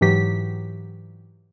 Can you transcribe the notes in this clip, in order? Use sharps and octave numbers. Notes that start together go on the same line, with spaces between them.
G#2 E3 F#3 G4 B6